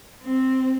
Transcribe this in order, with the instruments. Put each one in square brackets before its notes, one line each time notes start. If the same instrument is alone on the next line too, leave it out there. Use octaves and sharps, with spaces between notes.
[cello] C4